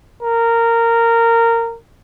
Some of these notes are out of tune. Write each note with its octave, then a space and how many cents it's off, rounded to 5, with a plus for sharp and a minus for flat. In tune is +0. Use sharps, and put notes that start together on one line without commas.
A#4 -15